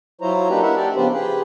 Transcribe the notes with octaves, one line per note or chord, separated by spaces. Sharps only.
F#3 E4 F4 C5 C#5 A#5
A#3 D4 D#4 G4 B4
E4 A#4 B4 E5 F#5
D4 G4 D5
C#3 F3 B3 G4 B4 C5
G4 G#4 B4